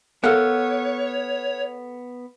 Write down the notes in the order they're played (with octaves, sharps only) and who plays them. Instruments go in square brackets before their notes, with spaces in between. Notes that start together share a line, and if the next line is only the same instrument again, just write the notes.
[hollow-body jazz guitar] B3 A#4 F5 [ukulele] A4 F#5 [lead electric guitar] C#5 [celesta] F6 F#6